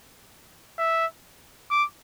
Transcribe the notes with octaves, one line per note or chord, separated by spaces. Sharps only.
E5
D6